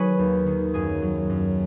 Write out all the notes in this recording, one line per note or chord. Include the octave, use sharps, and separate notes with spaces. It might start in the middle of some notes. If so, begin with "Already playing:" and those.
Already playing: D#3 F#3 G#4 B4 C#5 G#5 B5 C#6
D#2
D#3
F#2 G#4 G#5
F#3
F#2